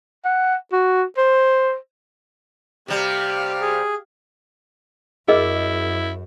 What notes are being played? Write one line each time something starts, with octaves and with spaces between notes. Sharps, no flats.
F#5
F#4
C5
C3 G3 G4 F5
G#4
F#2 E4 G#4 A#4 D#5